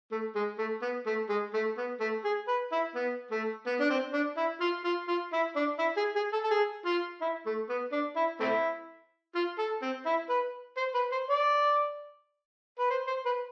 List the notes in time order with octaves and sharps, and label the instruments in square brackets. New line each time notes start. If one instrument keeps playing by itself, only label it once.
[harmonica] A3
G#3
A3
B3
A3
G#3
A3
B3
A3
G#4
B4
E4
B3
A3
B3
D4
C4
D4
E4
F4
F4
F4
E4
D4
E4
G#4
G#4
A4
A4
G#4
F4
E4
A3
B3
D4
E4
A3 C4 E4
F4
A4
C4
E4
B4
C5
B4
C5
D5
B4
C5
C5
B4